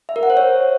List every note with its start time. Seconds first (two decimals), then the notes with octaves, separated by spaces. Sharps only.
0.09 E5
0.16 A#4
0.23 F#5
0.30 C5
0.37 C#5